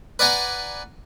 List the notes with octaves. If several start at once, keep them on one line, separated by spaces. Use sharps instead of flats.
B4 D5 F#5 G#5 A#5